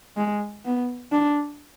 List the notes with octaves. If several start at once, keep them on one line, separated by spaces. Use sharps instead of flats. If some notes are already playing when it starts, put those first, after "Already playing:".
G#3
B3
D4